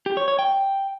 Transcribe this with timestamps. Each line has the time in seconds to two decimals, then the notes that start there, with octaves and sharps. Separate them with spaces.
0.06 G4
0.17 C#5
0.28 C#5
0.39 G5